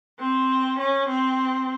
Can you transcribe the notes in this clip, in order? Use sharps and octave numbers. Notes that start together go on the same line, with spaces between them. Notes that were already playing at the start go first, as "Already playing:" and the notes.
C4
C#4
C4